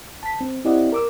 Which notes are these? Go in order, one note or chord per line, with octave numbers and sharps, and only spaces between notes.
A5 B6
C4
C4 E4 G4 D5 D#5 F#5
A#4 D6 E6